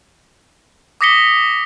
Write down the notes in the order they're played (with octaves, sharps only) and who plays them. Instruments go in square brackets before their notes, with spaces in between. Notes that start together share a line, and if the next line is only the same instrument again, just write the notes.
[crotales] D6 D#6 A#6 B6 C#7 G7